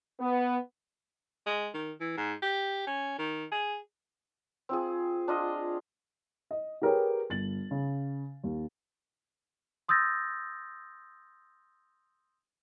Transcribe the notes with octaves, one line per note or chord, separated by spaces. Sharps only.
B3
G#3
D#3
E3
G#2
G4
C#4
D#3
G#4
C4 F4 G#4
D4 F4 D#5
D#5
G4 G#4 A#4 B4 C#5 G5
G1 A6 F#7
C#3
D#2
C6 D#6 E6 G6 A6 A#6